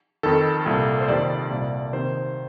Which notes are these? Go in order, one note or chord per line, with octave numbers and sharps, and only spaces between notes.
F2 D#3 A4
C2 A#2
C5
F2 C3 D#3 D5
C2 A#2
C3 D#3 C5